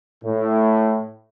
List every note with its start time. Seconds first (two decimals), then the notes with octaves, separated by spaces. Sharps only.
0.24 A2